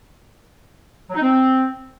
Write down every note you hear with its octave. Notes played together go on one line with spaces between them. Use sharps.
F#3
D#4
C4